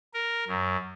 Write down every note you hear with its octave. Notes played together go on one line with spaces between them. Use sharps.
A#4
F#2